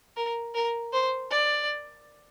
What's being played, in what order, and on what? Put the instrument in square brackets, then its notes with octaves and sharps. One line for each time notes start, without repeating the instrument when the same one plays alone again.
[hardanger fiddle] A#4
A#4
C5
D5